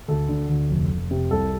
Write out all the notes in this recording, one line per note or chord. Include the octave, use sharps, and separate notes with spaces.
D2 A4
D3
D2
F1
F1
C3
C2 A4